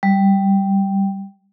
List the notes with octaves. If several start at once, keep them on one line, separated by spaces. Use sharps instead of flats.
G3